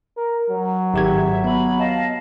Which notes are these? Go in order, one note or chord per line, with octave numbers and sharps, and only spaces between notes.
A#4
F#3
G#1 G4 E5 G#6
B3 B5
D#5 F5 A5